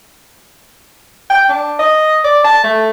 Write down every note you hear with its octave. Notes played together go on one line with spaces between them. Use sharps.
G5
D4
D#5
D5
A5
A3